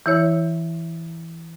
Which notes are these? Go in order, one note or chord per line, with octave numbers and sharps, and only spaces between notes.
E3 E4 C#5